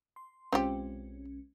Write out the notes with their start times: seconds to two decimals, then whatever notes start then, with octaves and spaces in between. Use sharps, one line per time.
0.16 C6
0.53 B1 G#3 C4 C#4 F4 G4